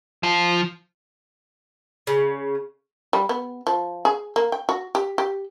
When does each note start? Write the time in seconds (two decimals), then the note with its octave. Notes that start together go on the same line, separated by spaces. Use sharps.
0.23 F3
2.07 C#3
3.13 G3
3.29 B3
3.67 F3
4.05 G#4
4.36 A#3
4.52 G5
4.69 F#4
4.95 G4
5.18 G4